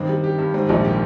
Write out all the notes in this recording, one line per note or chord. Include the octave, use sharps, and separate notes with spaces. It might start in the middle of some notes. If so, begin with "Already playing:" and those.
Already playing: G2 D#3 C4
G3
G4
G2
G#2 C4
A#1 A#2 G3
G4